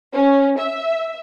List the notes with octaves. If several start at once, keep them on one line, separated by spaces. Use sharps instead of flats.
C#4
E5